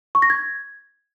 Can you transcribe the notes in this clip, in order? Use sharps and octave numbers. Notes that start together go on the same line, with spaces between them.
C#6
A#6
G#6